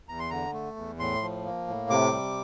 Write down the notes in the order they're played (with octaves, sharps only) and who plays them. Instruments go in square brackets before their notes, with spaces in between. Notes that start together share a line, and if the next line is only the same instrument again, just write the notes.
[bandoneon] E2 A#5
C6
D3 A#5
A3
E2
A2 C6
F3
A#3
A2
C3 D6
G3